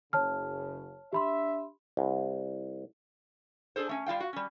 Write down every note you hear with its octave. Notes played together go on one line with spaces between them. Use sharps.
F#1 C#3 C#5 A5 F6
D4 G4 E5 B5 C6
C2
D4 G#4 A4 C5
A3 C#4
G3 F4 F5 G5
F#4
G3 C#4